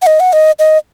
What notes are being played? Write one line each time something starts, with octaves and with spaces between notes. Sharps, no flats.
F#5
D#5
F#5
D#5
D#5